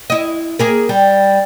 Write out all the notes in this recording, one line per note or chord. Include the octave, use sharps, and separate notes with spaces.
E4 D#5
A#3 G#4 A#4
G3